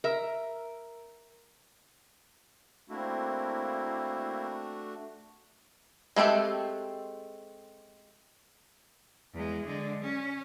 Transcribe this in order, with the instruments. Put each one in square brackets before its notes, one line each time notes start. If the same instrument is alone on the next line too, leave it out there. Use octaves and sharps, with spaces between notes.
[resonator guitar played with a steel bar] A#4 E5
[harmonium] A3 D4 F#4 [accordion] A#3 E4 [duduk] C4
[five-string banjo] G#3 A3 C4 G4 A4
[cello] E2 G#3
D3 G#3
C#4